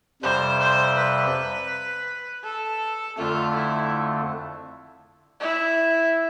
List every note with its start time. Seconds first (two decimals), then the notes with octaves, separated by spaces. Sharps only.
0.22 F2 C3 G3 C5
0.60 C5
0.97 B4
2.44 A4
3.18 F2 D3 A3 F4
3.55 E4
5.40 E4